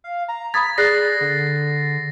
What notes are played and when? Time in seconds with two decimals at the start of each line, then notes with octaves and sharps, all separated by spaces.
0.04 F5
0.28 A#5
0.54 B5 D#6 G#6 A6 B6
0.78 G#4 D5 F#6 A6 A#6 C7
1.21 D3